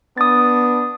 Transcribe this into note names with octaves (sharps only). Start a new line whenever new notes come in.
B3 D4 D#6 A6